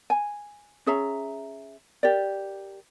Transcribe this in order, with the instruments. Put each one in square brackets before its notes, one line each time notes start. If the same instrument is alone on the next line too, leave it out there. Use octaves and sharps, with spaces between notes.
[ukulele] G#5
C#4 G#4 E5 A#5
G4 A#4 D5